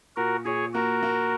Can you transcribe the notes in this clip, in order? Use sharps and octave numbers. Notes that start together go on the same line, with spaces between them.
A#2 F#4 A#4
A#2 G#4 C#5
A#3 F#4 A#4
A#3